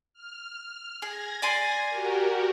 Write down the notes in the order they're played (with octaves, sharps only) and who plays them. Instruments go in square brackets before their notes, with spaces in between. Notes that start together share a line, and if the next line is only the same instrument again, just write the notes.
[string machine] F6
[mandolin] G#4 [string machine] G#6 A#6
[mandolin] D5 G#5 C6
[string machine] F#4 G4 A#4